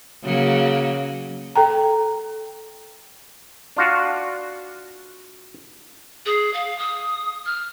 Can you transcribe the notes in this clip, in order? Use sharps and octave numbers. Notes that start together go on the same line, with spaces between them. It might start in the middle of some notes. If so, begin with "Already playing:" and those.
C#3 F#3 A#3
A4 G5 A#5
D4 F4 F#4
G#4
F5
D#6
F6